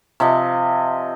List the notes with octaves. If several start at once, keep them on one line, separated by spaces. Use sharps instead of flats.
C3 F3 D#5